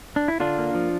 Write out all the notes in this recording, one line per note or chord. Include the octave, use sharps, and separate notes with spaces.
D4
E4
D3 D4 F4
A#3
F3